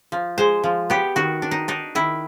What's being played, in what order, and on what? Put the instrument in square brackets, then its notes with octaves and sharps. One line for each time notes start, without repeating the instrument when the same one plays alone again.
[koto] F3
G#3 C5
F3
B3 G4
D#3 F#4
D4
D#4
D4 D#4
D#3 E4